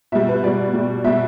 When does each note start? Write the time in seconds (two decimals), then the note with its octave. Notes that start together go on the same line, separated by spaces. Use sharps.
0.12 B2 G3 E5
0.29 B4
0.43 B2 G3 D5
0.74 G3
0.79 B2
1.04 B2 G3 E5